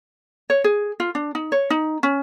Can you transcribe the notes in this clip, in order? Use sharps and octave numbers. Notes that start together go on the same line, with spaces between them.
C#5
G#4
F4
D4
D#4
C#5
D#4
C#4